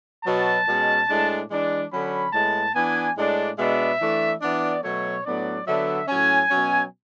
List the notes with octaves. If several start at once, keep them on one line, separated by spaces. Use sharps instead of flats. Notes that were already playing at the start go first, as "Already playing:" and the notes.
B2 F#3 B3 A5
B2 G#3 C#4
A2 G#3 D4
E3 G#3 D4
D3 F#3 C#4 B5
A2 G#3 B3 A5
E3 B3 D4 G#5
A2 G#3 D4
B2 G#3 B3 D4 E5
E3 A3 D4
E3 B3 D4 D5
B2 F#3 A3 C#5
A2 F#3 B3 D4 D5
D3 F#3 B3 D4 E5
A2 F#3 C#4 G#5
B2 F#3 C#4